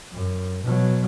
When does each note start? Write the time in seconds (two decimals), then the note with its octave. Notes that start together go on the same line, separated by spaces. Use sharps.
0.13 F#2
0.64 B2 F#3